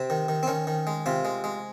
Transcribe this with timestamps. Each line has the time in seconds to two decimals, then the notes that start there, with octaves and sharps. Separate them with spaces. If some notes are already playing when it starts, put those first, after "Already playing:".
Already playing: C3 C4
0.10 D#3
0.28 D#3
0.43 C4
0.47 D#3 C#4
0.67 D#3
0.87 G#3
1.06 C3 F4
1.25 G#3
1.44 G#3